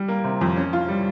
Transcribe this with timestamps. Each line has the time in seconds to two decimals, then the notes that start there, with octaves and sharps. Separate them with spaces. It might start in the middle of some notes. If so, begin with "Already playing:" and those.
Already playing: G3
0.08 A#3
0.24 C3
0.41 F2
0.56 C#4
0.73 F4
0.88 G3